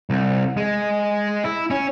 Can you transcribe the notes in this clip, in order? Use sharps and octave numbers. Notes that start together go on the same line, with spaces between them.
C2
G#3
E4
C#4